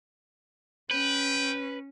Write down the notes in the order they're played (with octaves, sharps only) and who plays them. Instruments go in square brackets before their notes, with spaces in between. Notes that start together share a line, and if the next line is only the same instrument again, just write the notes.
[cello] C#4 [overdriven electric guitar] B4 [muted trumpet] G5